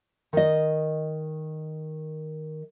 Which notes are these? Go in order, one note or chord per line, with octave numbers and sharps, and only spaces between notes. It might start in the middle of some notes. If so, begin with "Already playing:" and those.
D#3 D#5